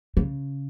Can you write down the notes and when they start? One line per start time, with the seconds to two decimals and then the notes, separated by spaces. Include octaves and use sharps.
0.17 C#3